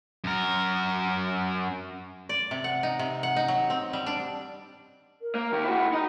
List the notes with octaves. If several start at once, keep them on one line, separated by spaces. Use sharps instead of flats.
F#2 A#4
D5
C3
F#5
D#4
C3
F#5
D#4
F#3
C4
G3
D4
A#4
A#3
D#3 A#3
E4 F#4 G5
B5
D#4 D#5